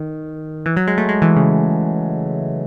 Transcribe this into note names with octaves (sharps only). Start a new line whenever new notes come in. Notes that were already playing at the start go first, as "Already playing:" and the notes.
Already playing: D#3
E3
F#3
G#3
A3
G#3
E3
C#3